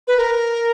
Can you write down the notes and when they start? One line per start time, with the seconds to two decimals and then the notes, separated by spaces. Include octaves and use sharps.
0.08 B4
0.18 A#4